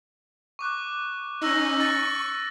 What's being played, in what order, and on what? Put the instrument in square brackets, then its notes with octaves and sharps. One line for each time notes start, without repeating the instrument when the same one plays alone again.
[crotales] C#6 D6 F#6
[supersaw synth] C#4 D#4 [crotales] C#6 E6 A#6
[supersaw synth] C#6 [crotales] A6